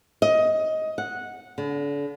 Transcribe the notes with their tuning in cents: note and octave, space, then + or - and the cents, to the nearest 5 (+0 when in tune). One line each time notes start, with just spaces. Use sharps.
D#5 +15
F#5 -10
D3 -40